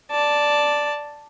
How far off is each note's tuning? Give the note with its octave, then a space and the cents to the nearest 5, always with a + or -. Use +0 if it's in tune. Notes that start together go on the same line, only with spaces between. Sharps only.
D5 +0 A5 +0